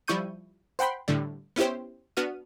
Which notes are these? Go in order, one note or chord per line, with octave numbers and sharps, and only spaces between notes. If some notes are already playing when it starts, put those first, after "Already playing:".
F3 G3 E4 C#6 G6 D#7
C5 F#5 G5 B5 C6
A2 D3 G3
B3 C#4 E4 G4 C5
B3 D4 F#4 F6 D#7